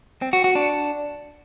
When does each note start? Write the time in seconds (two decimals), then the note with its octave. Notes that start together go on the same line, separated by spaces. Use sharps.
0.22 C4
0.33 F#4
0.44 F#4
0.55 D4